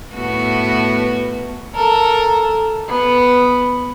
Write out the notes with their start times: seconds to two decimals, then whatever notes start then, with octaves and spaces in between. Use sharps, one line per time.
0.15 A2 B3 F#4
1.75 A4 A#4
2.88 B3